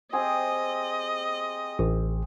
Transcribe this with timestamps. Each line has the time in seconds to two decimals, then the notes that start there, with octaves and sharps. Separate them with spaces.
0.13 C4 G4 G#4 D#5
1.79 A1